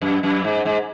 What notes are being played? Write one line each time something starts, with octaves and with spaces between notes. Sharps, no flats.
F#2
F#2
G#2
G#2